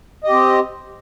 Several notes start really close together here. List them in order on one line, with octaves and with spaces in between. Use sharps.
D#5 G4 C4